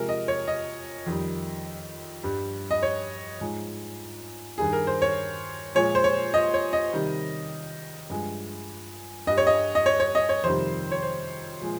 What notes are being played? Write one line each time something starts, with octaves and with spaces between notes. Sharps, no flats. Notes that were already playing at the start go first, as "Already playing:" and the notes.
Already playing: C3 F3 G#3 A#4
D#5
C#5
D#5
F2 D#3 G3
G2 G3
D#5
C#5
G#2 F3 G#3
G2 D#3 G3 G#4
A#4
C5
C#5
A#2 F3 G#3 C#5
C5
C#5
D#5
C#5
D#5
C3 D#3 G3
G2 F3 G#3
G2 G3 D#5
C#5
D#5
D#5
C#5
C#5
D#5
C#5
F2 C3 D#3 G3 C5
C#5
C5
A#2 F3 G#3